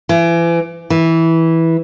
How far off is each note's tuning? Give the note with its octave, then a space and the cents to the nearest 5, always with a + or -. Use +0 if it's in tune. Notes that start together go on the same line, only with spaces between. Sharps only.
E3 +35
E3 -10